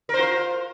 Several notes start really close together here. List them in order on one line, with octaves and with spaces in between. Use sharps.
A#4 C5 F4